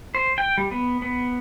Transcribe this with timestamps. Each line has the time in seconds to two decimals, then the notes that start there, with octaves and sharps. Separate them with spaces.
0.15 C5
0.38 G5
0.58 G3
0.71 B3
1.02 B3